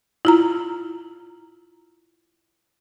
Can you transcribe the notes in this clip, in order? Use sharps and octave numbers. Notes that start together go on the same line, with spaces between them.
E4 F4 A#5